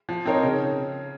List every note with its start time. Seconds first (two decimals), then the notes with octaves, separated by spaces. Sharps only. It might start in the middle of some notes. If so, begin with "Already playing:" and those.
0.09 F3
0.25 C4 D#4 A#4 C#5
0.43 C#3